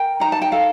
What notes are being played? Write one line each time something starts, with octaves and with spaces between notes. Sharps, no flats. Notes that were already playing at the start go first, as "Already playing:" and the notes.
Already playing: A#4 G5
D#4 A#5
A5
G5
A4 F5